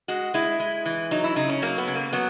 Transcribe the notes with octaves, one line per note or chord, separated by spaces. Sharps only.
G#3 F#4
G#3 E4
G#3
E3
F#3 D#4
E4
C#3 D#4
C#4
F#3 A#3
B3
C#3
A#3
F#3 B3